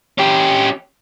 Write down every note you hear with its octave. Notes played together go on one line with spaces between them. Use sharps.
C#4 G4